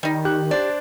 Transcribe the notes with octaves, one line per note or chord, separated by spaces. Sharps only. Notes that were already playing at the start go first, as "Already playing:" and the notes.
D#3 G3 D#4
G4 F#6
D4 C5 D5